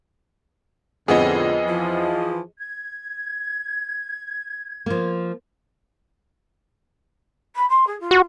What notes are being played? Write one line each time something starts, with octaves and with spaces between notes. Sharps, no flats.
F2 A2 D3 B3 C4 G#4 D#5
E3 F3
G#6
F3 A#3
B5
C6
G#4
F4
F#4